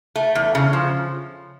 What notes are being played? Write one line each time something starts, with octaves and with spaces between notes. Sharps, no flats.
A3
E2
C#3
F3